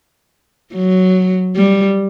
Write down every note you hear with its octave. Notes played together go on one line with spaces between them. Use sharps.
F#3
G3